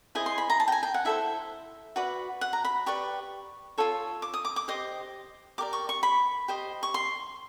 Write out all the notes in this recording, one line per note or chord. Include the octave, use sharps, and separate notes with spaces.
E4 G#4 C5 D#5 G#5
C6
B5
A#5
A5
G5
G#5
G5
F#5
E4 A4 C5 E5
F#4 B4 D5
F#5
A#5
B5
G4 B4 D5 C#6
F4 A4 C#5
D6
D#6
D6
D6
G4 C5 D#5 D#6
G4 A#4 D5 D6
C#6
C#6
B5
G4 C5 D#5
C#6
C6